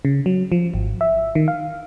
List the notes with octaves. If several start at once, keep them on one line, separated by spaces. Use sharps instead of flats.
C#3
F#3
F3
G#1
E5
D#3
F5